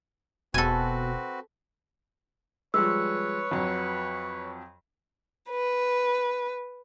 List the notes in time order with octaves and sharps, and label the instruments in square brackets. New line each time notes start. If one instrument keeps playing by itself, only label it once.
[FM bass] E1 [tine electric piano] B2 [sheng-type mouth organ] C4 F#4 B4 [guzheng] A4 G#5
[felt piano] F3 G3 G#3 [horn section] B4 C#5 [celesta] E6
[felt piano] F2 F#3
[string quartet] B4